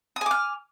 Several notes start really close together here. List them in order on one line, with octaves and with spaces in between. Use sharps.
D#6 G#5 D6 F6